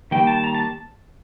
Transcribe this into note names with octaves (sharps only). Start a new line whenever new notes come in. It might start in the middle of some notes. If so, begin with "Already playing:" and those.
D#3 G3 A#3 G5
A5
A#5
A5